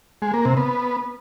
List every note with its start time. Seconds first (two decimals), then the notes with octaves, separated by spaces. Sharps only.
0.22 G#3
0.34 A#3
0.45 C3
0.57 B3